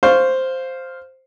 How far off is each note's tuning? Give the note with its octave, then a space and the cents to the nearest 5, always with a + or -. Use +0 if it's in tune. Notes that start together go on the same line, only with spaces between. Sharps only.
C5 +0 F5 +0 C#6 +0